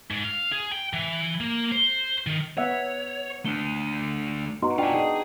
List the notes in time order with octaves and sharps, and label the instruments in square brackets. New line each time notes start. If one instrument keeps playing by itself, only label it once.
[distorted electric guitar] G#2
F5
G#4
G5
E3
A#3
C5
D#3
[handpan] B3 E5 F#5 [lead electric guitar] C#5
[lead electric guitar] A3 D4 [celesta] G7
[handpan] B3 D#4 F#4 [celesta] A#5 C6
[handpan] D4 [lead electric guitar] F4 G#5 [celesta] G5
[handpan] D#4 [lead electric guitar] G#4